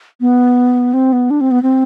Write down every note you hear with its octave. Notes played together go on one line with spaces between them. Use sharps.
B3
C4
B3
D4
C4
B3
C4